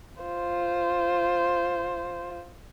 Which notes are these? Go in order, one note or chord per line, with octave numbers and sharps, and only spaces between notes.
F4 C5